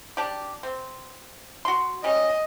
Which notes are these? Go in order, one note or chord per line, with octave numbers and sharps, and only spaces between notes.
D4 G4
C4
F#4 C6
G3 C#4 D#5